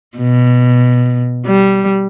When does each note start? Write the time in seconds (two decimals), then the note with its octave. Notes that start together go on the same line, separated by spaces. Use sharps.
0.18 B2
1.46 G3